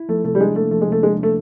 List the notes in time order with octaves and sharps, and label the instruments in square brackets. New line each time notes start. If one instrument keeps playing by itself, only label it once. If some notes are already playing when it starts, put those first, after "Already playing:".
Already playing: [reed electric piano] E4
[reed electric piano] F3 [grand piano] A3
[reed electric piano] C3 [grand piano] A3
[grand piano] G3
[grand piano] G#3 [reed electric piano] D4
[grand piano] A3 [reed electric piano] A#3
[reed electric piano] F3 [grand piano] A3
[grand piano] G#3
[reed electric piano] C3 [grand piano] A3
[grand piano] G#3 [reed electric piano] D4
[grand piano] A3 [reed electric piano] A#3